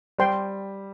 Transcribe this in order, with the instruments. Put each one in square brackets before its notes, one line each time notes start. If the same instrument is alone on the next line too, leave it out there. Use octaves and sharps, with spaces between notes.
[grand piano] G3 [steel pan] C5 G5 C6